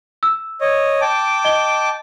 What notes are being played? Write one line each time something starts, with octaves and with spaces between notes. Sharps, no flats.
E6
C#5 D#5
G5 A5 D6
D#5 G7